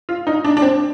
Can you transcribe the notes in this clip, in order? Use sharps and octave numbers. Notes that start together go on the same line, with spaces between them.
F4
D#4
D4
D4
C4